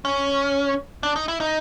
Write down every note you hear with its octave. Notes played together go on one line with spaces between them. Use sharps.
C#4
D4
D#4
E4
D#4